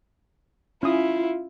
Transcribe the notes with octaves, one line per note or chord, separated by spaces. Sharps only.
C#4 E4 F4 D#6